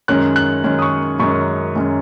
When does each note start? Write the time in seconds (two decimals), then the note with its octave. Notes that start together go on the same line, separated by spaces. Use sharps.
0.08 F#2 D#3 G#3 C#4 F#6
0.36 F#6
0.64 F#2 D#3 G#3 C#4
0.79 D#6
0.82 C#6
1.19 F#2 D#3 G#3 C#4 C#6
1.76 F#2 D#3 G#3 C#4